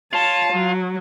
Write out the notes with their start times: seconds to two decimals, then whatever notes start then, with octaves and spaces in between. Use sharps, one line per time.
0.13 F4 C#5 A5
0.52 F#3